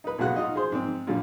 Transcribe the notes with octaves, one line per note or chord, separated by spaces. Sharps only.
D#4 B4
B1 A2 C#3 F#4 F#6
D#4 F4 F#4 D#5
G#4 C5
G#2 C4
F#2 A#2 D3 G3